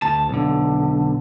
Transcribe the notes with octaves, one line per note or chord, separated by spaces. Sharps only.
D2 A5
B1 D3